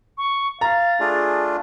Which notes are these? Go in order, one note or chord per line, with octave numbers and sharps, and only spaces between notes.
C#6
F5 A#5 A6
A3 D4 F4 G#4